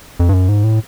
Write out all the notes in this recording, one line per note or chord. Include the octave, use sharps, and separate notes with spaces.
F2
G2
F#2
G#2
A2